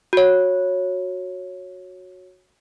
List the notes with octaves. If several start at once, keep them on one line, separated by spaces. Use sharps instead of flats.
F#4 C#5